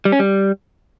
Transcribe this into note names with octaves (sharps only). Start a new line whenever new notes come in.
G3
C#4
G3